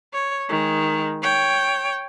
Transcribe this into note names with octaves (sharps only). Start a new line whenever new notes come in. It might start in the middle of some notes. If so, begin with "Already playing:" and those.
C#5
D#3 G#3
C#5 G5